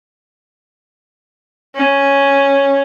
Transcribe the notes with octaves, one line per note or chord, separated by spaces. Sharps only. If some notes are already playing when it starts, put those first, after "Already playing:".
C#4